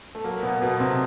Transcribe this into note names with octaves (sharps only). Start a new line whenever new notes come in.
A3
F#3 A#3
B2 B3
B2 A3 B3
C3 C4